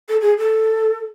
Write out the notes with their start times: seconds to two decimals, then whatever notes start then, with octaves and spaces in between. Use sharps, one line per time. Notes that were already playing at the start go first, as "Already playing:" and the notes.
0.09 A4
0.21 G#4
0.38 A4